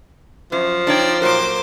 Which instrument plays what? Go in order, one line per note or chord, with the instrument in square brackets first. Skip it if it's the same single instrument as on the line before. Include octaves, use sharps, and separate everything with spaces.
[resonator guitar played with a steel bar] F#2 [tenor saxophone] F3
[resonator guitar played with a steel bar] D4 D#4 C#5 [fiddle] D5 G5
[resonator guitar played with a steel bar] A#2 F#3 A#4 [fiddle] C5 D6